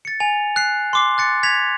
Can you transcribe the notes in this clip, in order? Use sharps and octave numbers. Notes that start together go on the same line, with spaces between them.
A6 C#7
G#5 F7
F#6 C7
C6 D6 C7
F#6 A6 C#7
G#6 B6 F7